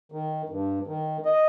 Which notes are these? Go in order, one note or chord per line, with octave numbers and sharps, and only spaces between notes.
D#3
G2
D#3
D#5